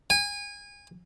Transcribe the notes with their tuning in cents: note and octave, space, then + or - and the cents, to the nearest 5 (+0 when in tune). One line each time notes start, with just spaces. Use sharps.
G#5 -30